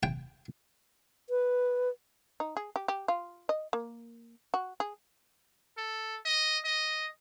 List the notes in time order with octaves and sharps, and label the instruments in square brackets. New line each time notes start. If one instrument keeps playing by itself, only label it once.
[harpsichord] G5
[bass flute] B4
[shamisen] D#4
G#4
G4
G4
F4
D#5
A#3
F#4
G#4
[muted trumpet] A4
D#5
D#5